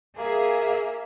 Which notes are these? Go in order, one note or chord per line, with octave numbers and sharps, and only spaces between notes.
A#3 G#4 E5